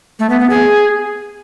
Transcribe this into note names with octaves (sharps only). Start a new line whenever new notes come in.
A3
B3
B3
G#4